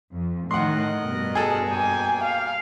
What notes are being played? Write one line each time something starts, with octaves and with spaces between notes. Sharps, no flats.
F2
A2 D#3 A#4 D#5 F#5 C6 F#6
G2 B2
G#4 A4
A#3 G5 G#5
F5